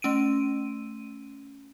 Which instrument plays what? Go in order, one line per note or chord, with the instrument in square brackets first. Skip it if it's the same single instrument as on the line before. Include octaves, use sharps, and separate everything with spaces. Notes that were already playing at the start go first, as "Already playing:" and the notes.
[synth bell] A3 C#4 D7 D#7